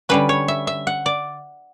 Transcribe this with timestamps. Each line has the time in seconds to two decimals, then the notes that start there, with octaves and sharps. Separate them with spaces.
0.09 D3 G3 C#4 B4
0.29 C#5
0.48 E5
0.67 E5
0.87 F#5
1.06 D5